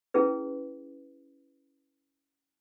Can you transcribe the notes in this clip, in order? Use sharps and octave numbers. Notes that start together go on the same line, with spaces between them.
C#4 E4 G#4 B4